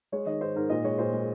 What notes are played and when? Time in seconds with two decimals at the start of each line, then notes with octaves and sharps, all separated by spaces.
0.12 G#3 C#5
0.26 D#3 D#5
0.41 G#2 C5
0.55 G#2 A#4
0.70 A#2 D#5
0.84 G#3 C#5
0.98 A#2 C5
1.13 G#3